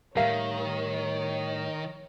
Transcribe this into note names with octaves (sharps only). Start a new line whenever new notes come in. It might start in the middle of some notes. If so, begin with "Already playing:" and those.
A2 D#3 G3 A#4 C#5 E5 F5